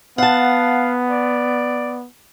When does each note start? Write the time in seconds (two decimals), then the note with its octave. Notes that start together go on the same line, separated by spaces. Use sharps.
0.18 B3 F5 F#5 A5
1.08 D5